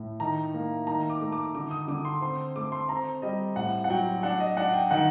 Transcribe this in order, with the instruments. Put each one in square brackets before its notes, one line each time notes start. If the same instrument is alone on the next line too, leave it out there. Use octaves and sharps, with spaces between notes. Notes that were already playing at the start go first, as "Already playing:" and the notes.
Already playing: [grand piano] A2
D#3 A#5
A#3
D#3 A#5
D6
A3
D6
D3 D6
D#6
D3 D6
C6
C4 C6
A3 D6
C6
C4 A#5
G3 D#5
A2 F#5
F#5
F#3 G5
D4 F#5
D#5
D4 F#5
G5
D#3 F#5